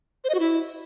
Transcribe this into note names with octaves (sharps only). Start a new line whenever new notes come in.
C5
D#5
F#4
E4